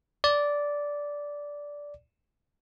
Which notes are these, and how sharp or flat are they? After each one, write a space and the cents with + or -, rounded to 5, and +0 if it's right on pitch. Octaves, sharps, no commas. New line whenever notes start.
D5 -10